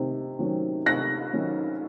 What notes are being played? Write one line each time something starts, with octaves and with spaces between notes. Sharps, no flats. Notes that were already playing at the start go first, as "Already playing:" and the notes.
Already playing: C3 D#3
D#3 F#3 C#4
C3 F#6 A#6
D#3 F#3 C#4